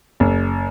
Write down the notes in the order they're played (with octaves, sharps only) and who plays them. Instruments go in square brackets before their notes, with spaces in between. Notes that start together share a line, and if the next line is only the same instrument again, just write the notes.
[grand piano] F#1